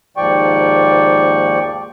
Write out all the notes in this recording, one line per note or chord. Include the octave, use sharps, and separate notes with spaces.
D#2 G#2 F3 D5 G5 C#6